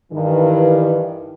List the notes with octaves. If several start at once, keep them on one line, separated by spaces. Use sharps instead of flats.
G2 D#3 E3